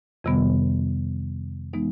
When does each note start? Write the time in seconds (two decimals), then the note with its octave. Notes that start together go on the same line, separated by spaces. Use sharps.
0.24 F2 C3 D#3 G3 B3
1.73 E3 G#3 B3 D#4